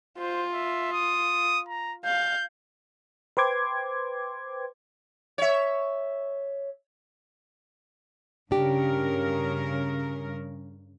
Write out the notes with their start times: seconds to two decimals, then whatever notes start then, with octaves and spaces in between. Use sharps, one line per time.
0.19 F4 C5
0.53 E5
0.92 D#6
1.69 A#5
2.05 F5 G6
3.37 B4 C5 G5 C6 D6 G#6
5.38 C#5 E5
8.51 G2 C#3 D4 G4 A#4